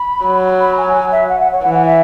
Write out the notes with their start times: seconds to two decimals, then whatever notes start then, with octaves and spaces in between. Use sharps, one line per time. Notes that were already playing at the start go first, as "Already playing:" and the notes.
Already playing: B5
0.25 F#3
0.60 B5
0.77 G#5
0.94 G#5
1.12 E5
1.29 F#5
1.40 F#5
1.52 C#5
1.63 E3 F#5
1.74 F#5
1.86 E5